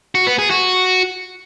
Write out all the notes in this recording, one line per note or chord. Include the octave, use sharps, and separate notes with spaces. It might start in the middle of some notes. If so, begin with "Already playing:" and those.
F#4
B3
G#4
F#4